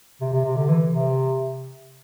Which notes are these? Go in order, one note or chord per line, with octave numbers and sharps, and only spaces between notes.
C3
C3
C3
D3
E3
C3